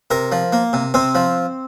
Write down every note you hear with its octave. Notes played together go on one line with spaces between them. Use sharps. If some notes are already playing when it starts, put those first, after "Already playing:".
C3 A#4
F3
A#3
C3
C3 C4
F3